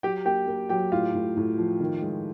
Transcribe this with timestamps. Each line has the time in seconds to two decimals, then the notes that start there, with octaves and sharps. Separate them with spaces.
0.03 F#3 G4 G5
0.26 A#3 G4 G5
0.48 A#3
0.69 F#3 G4 G5
0.92 A2 F4 F5
1.14 A2
1.36 A2
1.58 F3
1.80 D#3
2.02 G#3